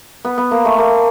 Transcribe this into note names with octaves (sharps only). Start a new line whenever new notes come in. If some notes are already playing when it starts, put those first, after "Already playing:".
B3
B3
A#3
A3
A#3